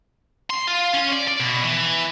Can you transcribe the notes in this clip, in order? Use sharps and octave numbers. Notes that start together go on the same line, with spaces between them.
C6
F4
C#4
D5
D5
B2
E3